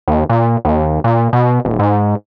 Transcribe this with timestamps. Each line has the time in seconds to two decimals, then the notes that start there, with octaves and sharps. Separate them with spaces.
0.08 D#2
0.29 A#2
0.65 D#2
1.04 A#2
1.33 B2
1.65 D#1
1.79 G#2